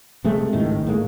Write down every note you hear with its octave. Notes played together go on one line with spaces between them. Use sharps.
C3 G#3 A3
G#1 C#2 A2 D#3
A2 G#3 A#3